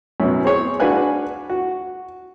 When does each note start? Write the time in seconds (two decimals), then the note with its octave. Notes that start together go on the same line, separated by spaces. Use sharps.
0.20 F#2 B2
0.44 C4 G#4 C#5
0.80 D4 F#4 B4 F5 G#5 F#6
1.50 F#4